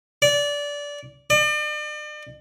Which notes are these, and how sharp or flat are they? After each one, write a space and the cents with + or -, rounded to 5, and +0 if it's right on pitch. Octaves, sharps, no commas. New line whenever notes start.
D5 -20
D5 +40